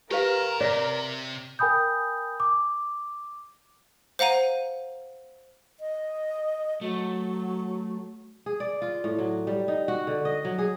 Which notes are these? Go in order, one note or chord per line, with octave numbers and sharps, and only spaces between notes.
G4 A#4 B4 F5 G5 A#5
C3 C#5 D5
A#4 G5 G#5 B5 D#6 G6
D6
C5 F5 F#5 A#5 D#7
D#5
F#3 A3
G#4
D5
F4
A2
F#3
G3
D#4
F#4
D3
D#5
F#3
G#4